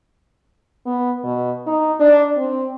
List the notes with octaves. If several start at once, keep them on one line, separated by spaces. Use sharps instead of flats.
B3
B2
D#4
D4
C4